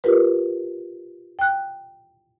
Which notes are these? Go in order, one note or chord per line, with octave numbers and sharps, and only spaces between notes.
F4 G4 A#4 B4
G5 F#6